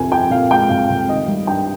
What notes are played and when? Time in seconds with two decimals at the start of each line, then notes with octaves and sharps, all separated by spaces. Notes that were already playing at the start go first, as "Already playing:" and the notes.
Already playing: C2 F2 C3 F3 G#5
0.12 F2 G5
0.30 A#2 F5
0.50 G#3 G5
0.69 C2 F5
0.89 C2
1.08 D#3 D#5
1.28 G3
1.47 G2 G5